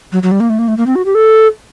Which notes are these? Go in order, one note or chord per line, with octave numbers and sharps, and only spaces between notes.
F#3
F#3
G3
A#3
A3
A#3
A3
A#3
C4
F#4
G4
A4